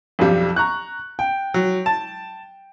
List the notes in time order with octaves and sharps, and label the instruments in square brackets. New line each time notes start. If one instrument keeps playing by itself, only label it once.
[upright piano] B1 F2 G3
A#5 C#6 F#6
G5
[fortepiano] F#3
A5